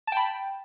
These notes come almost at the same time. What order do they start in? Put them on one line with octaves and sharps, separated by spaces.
A5 G5 B5